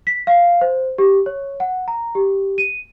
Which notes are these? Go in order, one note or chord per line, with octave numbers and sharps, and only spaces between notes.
B6
F5
C5
G4
C#5
F#5
A#5
G4
D#7